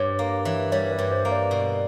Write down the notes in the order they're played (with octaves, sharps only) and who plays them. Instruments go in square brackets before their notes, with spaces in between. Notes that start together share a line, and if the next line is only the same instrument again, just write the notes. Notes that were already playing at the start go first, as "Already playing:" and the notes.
Already playing: [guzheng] G2 [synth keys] C#5
[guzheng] A#3
E3
[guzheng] G3 [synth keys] C#5
[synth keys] B4
[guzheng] G2
[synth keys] C5
[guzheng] A#3
[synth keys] D5
[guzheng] B2